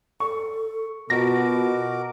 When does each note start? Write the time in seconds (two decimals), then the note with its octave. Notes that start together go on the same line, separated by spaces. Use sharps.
0.20 A4 C#6
1.10 B2 F4 F#4 A#4 D6 A#6